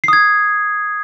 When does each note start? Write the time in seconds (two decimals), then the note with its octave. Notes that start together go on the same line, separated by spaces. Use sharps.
0.04 C7
0.08 D#6
0.13 G#6